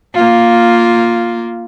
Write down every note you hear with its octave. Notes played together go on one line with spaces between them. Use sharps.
A#3 F4